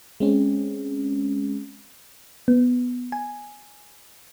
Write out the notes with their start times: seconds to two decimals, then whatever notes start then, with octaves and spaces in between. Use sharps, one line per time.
0.20 G#3 C4 C#4
2.48 B3
3.12 G#5